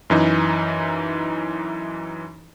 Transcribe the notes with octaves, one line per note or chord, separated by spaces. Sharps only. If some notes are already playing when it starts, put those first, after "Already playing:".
F#2 E3 D#4